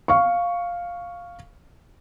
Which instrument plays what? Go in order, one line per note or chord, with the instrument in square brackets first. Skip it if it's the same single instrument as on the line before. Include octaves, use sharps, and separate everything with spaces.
[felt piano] F5 C#6